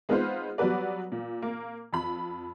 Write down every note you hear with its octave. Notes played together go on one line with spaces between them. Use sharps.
G#3 B3 D#4 F4 B4 C5
F#3 G3 B3 F#4 B4 D5
A#2
A#3
F2 B5